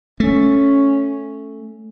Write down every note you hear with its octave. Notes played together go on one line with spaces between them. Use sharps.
A3 C#4